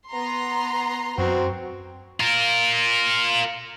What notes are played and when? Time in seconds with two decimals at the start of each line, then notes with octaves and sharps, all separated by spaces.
0.10 B3 A#5 C6
1.18 F#2 C4 F#4
2.20 F4 A#4